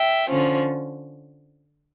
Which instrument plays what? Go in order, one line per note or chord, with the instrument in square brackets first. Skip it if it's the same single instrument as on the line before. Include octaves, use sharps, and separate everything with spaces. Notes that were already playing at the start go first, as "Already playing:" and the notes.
Already playing: [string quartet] E5 G5
D3 F3 C#4